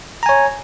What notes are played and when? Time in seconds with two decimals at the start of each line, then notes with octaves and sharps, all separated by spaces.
0.23 A#5
0.26 G#5
0.29 C#5